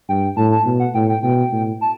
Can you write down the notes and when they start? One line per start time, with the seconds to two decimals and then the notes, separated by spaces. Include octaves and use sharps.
0.09 G2 G5
0.37 A2 A5
0.52 A5
0.65 B2
0.80 F#5
0.95 A2 G5
1.09 G5
1.23 B2 G5
1.52 A2
1.81 A5